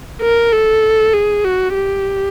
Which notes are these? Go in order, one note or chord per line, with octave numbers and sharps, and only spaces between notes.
A#4
A4
G#4
F#4
G4